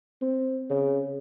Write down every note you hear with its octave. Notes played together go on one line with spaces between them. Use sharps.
C4
C#3